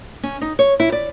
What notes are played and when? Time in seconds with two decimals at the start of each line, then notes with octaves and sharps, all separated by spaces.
0.23 C#4
0.41 D#4
0.59 C#5
0.80 E4
0.92 D5